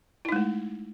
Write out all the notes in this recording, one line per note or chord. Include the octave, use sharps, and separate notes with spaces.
G#3 A3 D#4 E4